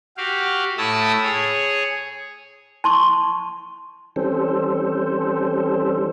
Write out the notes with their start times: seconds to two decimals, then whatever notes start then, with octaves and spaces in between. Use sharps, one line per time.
0.17 F#4 G4 F5
0.78 A2 A3 E4 A5 D#6 E6
1.23 G#4 C#5
2.84 A5 C6 C#6
4.16 E3 G3 C4 C#4 A4 C5